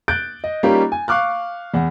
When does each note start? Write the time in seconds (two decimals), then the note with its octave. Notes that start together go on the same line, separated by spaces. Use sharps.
0.08 F#6 G6 A6 D7
0.44 D#5
0.63 G3 A#3 C#4 D#4 F4 G4
0.92 G#5
1.08 F5 C#6 D6 F6 F#6
1.74 E2 F#5